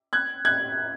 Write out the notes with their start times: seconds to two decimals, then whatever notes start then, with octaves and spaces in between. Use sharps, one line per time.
0.13 F#6 G#6
0.45 F#6 G#6